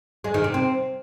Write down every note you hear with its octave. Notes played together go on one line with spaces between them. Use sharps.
G#3
D#3
C3
C4